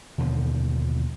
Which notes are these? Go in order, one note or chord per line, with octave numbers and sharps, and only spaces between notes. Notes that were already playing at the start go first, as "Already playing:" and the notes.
D#2 B2 D3 F3